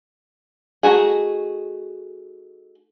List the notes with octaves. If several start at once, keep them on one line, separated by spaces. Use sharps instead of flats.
A3 D#4 F#4 G#4